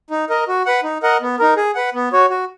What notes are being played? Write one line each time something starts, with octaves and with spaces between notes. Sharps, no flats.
D#4
A#4 D#5
F#4
B4 F#5
D#4
A#4 D#5 F#5
B3
D#4 A#4
G#4
B4 F#5
B3
F#4 C#5
F#4